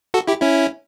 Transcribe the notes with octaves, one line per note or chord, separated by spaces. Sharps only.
F#4 A4
E4 G4
C#4 E4